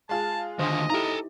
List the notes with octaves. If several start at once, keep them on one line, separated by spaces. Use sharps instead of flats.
G#3 F4 G#4 A5
D#2 D3 C5 D#5 G#5
D#4 E4 G4 A4 A#5